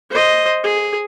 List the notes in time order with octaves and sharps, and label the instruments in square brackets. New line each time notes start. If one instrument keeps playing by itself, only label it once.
[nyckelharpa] C5 D#5
G#4